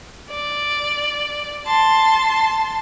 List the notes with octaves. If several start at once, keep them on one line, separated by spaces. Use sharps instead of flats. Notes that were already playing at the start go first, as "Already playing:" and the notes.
D5
A5 C6